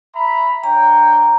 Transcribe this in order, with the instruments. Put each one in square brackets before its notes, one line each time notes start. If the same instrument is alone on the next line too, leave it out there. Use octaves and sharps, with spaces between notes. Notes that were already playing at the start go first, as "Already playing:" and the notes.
[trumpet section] E5 A#5 B5
[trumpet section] D4 C#5 G5 [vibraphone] A#5